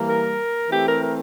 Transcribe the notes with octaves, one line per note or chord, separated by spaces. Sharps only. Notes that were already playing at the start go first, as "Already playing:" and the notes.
Already playing: E3 G3 A#3
A#4
E3 A3 C4 G4
A#4
A#4